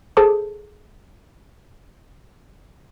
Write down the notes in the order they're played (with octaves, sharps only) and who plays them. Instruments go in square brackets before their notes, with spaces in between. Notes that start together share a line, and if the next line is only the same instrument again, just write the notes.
[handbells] G#4 A4 C5 A5 D6